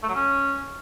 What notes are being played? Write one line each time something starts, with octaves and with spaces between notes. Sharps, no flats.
A3
F#3
C#4